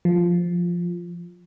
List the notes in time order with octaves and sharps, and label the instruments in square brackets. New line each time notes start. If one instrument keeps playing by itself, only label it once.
[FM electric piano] F3